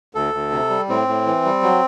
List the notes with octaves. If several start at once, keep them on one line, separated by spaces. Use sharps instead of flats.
D2 A4
D2
C3
G3
A2 C4
A2
E3
G3
F#3